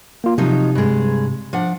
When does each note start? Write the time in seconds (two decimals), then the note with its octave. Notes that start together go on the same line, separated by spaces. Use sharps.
0.24 A#3 F4
0.38 C3 F3 F#3 D#4
0.75 G2 G#3
1.53 F3 D4 F#5